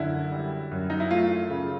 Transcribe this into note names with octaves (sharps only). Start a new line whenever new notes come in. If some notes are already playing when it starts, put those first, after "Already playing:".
Already playing: F#2 D3 E4
G3
F#2
D#4
E4
A3 F4
C#3